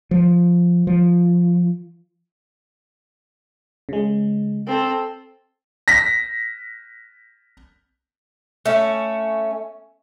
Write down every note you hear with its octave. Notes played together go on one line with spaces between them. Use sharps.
F3
F3
C#3 G#3
C4 A4
A#6 B6
A3 C#4